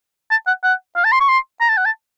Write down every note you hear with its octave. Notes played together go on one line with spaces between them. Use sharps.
A5
F#5
F#5
F5
A5
C6
C#6
C6
A#5
A5
F#5
A5